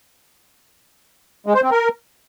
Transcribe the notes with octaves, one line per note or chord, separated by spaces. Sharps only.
G#3
C5
C4
A#4